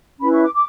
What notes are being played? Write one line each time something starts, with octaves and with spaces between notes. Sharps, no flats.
C#4 E4 B4 B5
C#6
D6
D6